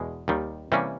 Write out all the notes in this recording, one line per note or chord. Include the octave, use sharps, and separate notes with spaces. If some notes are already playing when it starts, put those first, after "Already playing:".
Already playing: E2 B2 G#3
D#2 D#3 G3
C3 E3 G3 A#3 C#4